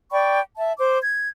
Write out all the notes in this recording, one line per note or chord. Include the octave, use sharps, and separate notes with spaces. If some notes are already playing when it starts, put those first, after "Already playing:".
D5 G5 B5 C#6
E5 A5
C5 D6
G#6